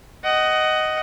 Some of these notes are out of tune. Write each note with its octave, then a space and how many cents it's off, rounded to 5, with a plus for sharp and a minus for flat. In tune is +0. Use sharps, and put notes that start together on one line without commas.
D#5 +0 F#5 +20